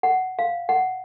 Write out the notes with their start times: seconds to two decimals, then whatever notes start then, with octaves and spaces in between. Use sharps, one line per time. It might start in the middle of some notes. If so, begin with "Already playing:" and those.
0.03 F#5
0.39 F5
0.69 F#5